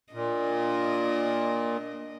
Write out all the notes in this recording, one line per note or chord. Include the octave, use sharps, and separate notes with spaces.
A#2 D4 D#5